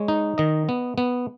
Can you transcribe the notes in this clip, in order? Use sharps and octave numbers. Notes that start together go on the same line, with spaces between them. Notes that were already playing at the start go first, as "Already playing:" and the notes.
Already playing: G#3 C#5
D#4
D#3 D#5
B3
B3